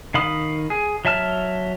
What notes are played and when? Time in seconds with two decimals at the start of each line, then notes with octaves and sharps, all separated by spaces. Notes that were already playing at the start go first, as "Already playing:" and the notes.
0.14 D#3 F5 B5 D#6
0.70 G#4
1.05 F#3 E5 A5 F6